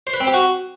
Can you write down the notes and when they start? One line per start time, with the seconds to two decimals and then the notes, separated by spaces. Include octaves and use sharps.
0.07 C5
0.14 B4
0.20 C4
0.27 G4
0.34 F#4